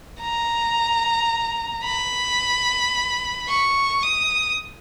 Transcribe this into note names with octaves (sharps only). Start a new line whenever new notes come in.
A#5
B5
C#6
D#6